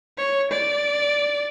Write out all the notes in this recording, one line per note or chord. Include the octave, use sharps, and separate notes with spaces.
C#5
D5